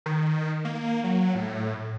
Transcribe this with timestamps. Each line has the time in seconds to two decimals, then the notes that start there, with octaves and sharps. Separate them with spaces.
0.06 D#3
0.65 A#3
1.04 F#3
1.35 A2